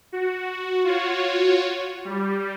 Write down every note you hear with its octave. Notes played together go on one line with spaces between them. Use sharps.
F#4
F4 F#4 C#5
G3